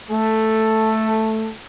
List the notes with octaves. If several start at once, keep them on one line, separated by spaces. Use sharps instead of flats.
A3 A4